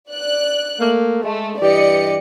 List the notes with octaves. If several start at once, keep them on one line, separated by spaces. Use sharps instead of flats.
D5 F#6
A3 A#3
G#3 A3
G2 E3 G4 D5 D#5 C#7